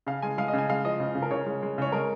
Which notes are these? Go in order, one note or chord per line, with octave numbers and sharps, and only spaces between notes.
C#3 F5
G#3 G#5
G#3 F5
D#5
C#3
G#5
G#3 F5
F3 D#5
C#3
C#3
A#4
C#3 C#5
G#3
G#3
C#3 C#5
G#3 A#4